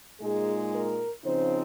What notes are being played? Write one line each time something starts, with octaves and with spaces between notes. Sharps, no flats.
A#2 G#3 D#4 G#4
A#4
C#3 F3 C4 D#4 C5